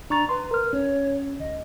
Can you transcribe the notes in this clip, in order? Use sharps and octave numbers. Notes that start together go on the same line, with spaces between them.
D4 A#5 C#6 A6
B4 A#5 C6
A#4 F6
C#4 C#5
D2 D#5